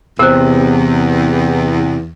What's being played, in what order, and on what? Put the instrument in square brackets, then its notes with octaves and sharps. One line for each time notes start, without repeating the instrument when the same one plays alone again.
[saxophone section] E2 [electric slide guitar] C3 [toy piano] A#4 C5